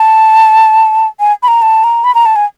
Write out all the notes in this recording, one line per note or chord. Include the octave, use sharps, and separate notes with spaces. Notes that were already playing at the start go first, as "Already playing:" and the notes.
Already playing: A5
G#5
B5
A#5
A5
A#5
B5
A#5
A5
G#5